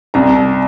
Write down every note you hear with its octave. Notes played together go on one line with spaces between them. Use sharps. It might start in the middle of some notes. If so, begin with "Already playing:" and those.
C2 A#5